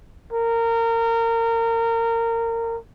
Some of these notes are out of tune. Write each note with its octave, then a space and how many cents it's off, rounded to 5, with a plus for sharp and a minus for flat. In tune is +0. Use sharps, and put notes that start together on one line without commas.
A#4 -25